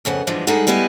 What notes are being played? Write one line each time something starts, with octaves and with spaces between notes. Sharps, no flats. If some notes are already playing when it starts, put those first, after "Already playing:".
F2 C#3 B3 F#5
G2 D3 E3 F3 G#3
G3 G#3 D#4 G#4 A4 F#5
G3 G#3 B3 E4 D#5